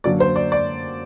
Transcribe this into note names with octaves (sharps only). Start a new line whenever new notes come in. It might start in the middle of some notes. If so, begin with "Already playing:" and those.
F#2 D3 F#3 A#3 D5
C5
D5
D5